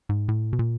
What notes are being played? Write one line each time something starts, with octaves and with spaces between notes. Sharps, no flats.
G#2
A2
B2
A#2